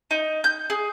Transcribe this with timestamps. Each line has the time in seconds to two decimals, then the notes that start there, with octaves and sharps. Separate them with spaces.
0.11 D#4
0.44 G6
0.70 G#4